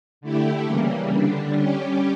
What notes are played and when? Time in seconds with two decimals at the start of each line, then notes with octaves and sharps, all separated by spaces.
0.21 D3 A3 E4 G4
0.66 C#3 E3 G3 A#3
1.11 D3 G3 D4
1.55 G3 C#4 G4